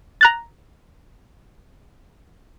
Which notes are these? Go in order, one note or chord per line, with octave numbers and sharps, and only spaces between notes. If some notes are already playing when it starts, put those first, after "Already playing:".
A#5 F#6 A6